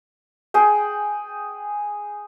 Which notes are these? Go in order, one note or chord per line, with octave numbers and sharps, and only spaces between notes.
G#4 F#5 G5